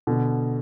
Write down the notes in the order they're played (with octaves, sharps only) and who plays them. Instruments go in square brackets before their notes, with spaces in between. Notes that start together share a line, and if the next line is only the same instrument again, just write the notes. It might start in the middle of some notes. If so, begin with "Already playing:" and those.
[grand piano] B2 D3